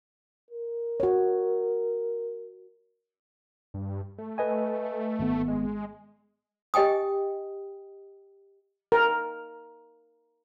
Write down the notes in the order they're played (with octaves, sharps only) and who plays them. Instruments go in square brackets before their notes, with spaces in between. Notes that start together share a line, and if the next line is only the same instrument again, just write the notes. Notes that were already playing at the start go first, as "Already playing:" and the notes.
[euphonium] A#4
[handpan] F#4 C#5
[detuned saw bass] G2
A3
[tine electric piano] B4 D#5 G#5
G#1 B3
[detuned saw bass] G#3
[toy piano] G4 D#5 G5 G#5 D#6
[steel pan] A#4